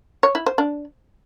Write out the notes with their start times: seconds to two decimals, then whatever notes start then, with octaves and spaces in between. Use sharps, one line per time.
0.23 C#5
0.35 E4
0.46 C5
0.58 D4